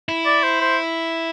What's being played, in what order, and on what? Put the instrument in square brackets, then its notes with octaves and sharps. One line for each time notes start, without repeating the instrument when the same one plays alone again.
[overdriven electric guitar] E4
[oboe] D5
C5
C5